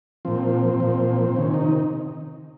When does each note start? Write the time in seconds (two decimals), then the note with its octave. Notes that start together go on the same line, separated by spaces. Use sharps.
0.25 A#2 F3 C4
0.80 A#2 F3
1.36 C3 D#3 C#4
1.54 D#4